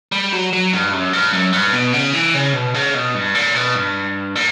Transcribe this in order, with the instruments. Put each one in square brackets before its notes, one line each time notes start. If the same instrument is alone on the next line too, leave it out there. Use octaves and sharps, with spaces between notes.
[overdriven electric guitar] G3
F#3
F#3
G2
F#2
G2
F#2
G2
B2
C#3
E3
C#3
B2
C#3
B2
G2
A#2
B2
G2
A#2